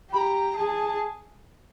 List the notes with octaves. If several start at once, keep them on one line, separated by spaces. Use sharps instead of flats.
G4 B5
A#5
G#4 A5